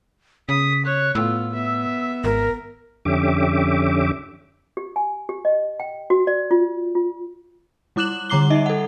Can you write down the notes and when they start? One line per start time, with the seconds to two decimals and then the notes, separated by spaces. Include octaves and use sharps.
0.49 C#3 D#6 B6
0.85 C#5 F#6
1.15 A2 B3 F4 E6
1.52 B3 E5
2.24 G#1 A#4
3.05 F2 D3 C#4 G4 E5 D6
4.77 G4
4.96 G#5
5.29 G4
5.45 D#5
5.80 G5
6.10 F#4
6.27 D5
6.51 F4
6.95 F4
7.96 G3 E4 D6 F#6 E7 F#7
8.30 D3 G3 A#5 D6 C7 G7
8.50 D#4 D#5 E5
8.66 A4 F#5